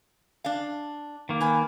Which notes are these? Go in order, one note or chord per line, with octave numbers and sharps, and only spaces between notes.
D4 F5
D#3 A#3
B4 G#5